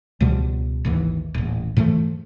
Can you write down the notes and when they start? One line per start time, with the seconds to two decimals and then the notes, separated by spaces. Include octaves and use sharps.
0.20 C#2 B2 F3 G3
0.85 G#1 D#2 E3
1.34 D#1 A1
1.77 G#2 E3 F3 A3